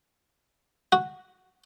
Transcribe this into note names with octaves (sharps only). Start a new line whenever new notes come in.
F#4